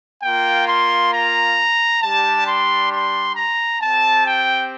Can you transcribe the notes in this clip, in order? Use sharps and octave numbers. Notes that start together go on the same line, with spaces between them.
A#3 F4 G5
C6
A#5
G3 D4 G4 A5
C6
C6
A#5
C4 G4 A5
G5